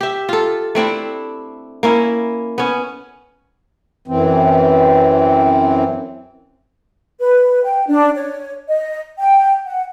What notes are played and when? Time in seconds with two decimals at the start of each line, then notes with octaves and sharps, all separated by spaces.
0.01 G4 E5
0.29 F4 A4
0.75 A3 C4 D4 E4
1.83 A#3 C#4 E4
2.58 B3 C#4
4.08 F#2 E3 C4
7.20 B4
7.64 G5
7.88 D4
8.16 C#5
8.68 D#5
9.19 G5
9.66 F#5